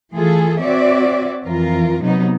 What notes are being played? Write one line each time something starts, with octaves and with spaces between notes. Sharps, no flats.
E3 A3 F4 G#4 A4
C4 F#4 C#5 D5 E5
F2 E3 F4 A#4
C3 F#3 B3 D#4